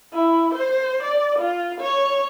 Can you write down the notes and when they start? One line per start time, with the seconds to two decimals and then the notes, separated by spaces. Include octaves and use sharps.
0.13 E4
0.55 C5
1.03 D5
1.39 F4
1.81 C#5